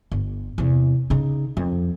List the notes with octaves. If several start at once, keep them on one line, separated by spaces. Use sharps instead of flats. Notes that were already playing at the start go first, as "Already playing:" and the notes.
G1
E2 C3
C#3 D#4
F2